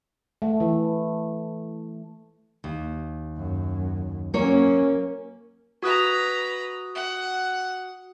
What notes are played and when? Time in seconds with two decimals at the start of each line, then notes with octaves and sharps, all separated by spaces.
0.42 A3
0.60 E3
2.64 D#2
3.37 F#2
4.34 F#3 A#3 C#4 C#5
5.83 F#4 B4 A#5 D#6 F#6
6.95 F#5